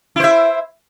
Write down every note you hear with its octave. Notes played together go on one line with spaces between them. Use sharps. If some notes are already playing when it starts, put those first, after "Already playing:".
E4 C5 E5